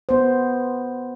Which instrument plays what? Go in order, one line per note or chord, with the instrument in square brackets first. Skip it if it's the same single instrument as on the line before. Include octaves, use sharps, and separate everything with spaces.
[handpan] B3 C5